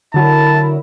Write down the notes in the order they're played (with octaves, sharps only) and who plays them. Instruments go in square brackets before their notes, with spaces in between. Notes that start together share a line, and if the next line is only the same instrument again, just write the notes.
[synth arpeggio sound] D3 F#3 [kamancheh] E4 A#4 [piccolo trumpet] A5